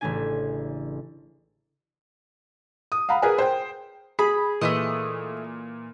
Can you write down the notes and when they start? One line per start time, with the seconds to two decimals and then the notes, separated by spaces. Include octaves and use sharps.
0.01 A1 C#3 E3 A3 D4 G#5
2.92 D#6
3.09 F5 F#5 A#5 B5
3.22 G#4 A#4 B4 G#5
3.38 C5 G5
4.19 G#4 B5
4.61 A#2 E3 A3 C#4 D#5